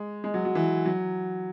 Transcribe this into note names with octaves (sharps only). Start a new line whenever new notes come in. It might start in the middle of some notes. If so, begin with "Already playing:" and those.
Already playing: G#3
G#3
F#3
F#3
E3
F#3